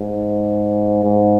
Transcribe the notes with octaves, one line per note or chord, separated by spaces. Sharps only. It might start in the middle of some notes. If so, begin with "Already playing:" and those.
Already playing: G#2
G#2